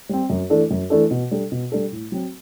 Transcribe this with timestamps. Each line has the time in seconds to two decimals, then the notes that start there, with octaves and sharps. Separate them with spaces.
0.09 G3 C4
0.30 F#2
0.50 E3 A3 D4 A4
0.71 F#2
0.90 E3 A3 D4 A4
1.11 B2
1.31 G3 D4 A4
1.52 B2
1.72 G3 D4 A4
1.92 A2
2.12 F#3 C4